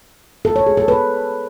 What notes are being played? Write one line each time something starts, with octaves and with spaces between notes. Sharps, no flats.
A4
C#5
G#4
A4
B4